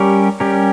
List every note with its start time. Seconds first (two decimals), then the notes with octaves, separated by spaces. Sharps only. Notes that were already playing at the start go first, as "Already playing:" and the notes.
Already playing: G3 C#4 G4 A#4
0.40 G3 C#4 G4 A#4